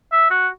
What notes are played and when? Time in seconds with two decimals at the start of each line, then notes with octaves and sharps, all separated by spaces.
0.12 E5
0.31 F#4